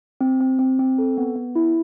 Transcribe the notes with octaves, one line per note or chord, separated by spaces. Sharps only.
C4
C4
C4
C4
A4
B3
B3
E4